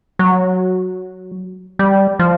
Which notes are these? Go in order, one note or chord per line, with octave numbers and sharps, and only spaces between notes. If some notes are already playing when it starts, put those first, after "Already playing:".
F#3
G3
F3